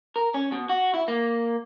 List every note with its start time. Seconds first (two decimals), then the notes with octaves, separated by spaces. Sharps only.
0.16 A#4
0.34 C#4
0.52 B2
0.69 F#4
0.94 E4
1.08 A#3